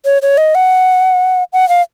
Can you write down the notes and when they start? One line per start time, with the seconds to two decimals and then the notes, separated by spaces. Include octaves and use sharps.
0.05 C#5
0.22 C#5
0.37 D#5
0.55 F#5
1.53 F#5
1.69 F5